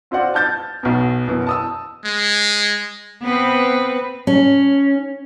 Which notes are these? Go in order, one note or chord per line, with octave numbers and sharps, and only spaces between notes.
C4 F4 F#4 C5 D5 F#5
A5 F6 G6 A6
B1 B2
F#2 B2 E3
A5 D#6 E6
G#3
B3 C4 B4
C#4